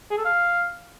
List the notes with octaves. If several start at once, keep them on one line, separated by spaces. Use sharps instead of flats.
G#4
A4
F5